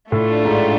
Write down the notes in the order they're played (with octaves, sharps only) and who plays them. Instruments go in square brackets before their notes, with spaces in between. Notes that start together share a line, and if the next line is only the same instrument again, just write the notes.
[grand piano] A2 [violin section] A3 D4 F4
[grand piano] G#2